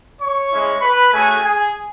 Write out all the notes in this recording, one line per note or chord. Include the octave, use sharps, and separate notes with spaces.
C#5 C#6
G#3 C#4 E4
B4 B5
A3 C#4 F#4 G#4 G#5
G#4 G#5